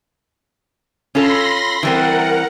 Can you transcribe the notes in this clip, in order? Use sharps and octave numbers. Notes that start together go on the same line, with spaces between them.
C#4 F4 A4 B5 C6 A#6
E3 G3 C4 A#4 F#5